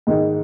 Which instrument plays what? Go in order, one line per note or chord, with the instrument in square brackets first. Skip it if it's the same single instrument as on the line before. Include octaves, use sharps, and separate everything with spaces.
[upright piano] G#2 D#3 G#3 D#4